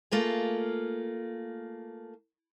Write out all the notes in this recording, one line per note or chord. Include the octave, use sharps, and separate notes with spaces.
A3 A#3 F4 G#4